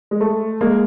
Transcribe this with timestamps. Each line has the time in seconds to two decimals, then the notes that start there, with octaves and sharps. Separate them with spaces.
0.11 G#3
0.21 A3
0.61 G#3 A#3